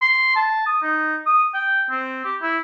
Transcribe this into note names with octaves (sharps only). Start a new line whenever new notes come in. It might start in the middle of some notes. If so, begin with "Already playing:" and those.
C6
A5
D#6
D#4
D#6
G5
C4
G4
E4